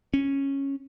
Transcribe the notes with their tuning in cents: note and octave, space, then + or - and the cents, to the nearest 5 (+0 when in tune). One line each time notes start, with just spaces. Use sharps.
C#4 -10